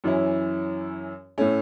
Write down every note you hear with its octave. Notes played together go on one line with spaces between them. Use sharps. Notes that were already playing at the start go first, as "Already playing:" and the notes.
F#2 E3 C#4 E4
A2 A3 C#4